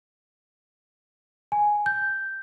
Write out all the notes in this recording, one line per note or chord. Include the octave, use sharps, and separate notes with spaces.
G#5
G6